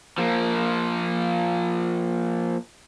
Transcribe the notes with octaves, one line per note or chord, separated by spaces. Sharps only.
F3 A#3